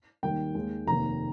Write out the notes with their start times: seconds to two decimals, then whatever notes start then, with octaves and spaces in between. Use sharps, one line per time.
0.23 D#2 D#3 G3 G5
0.55 D#2 D#3 G#3
0.87 F1 D#2 D#3 A#5